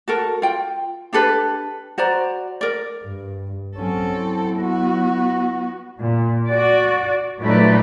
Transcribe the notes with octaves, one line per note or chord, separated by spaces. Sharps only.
F#4 A4 A#4
F4 G5
D4 G4 A4 B4
F#4 C5 D5 A#5
A#4 D5
G2
F#3 C4 C#4 A4
F#3 E4
B3 F#4
A#2
F#4 D5
A#2 F#3 A3 D#4 B4 D5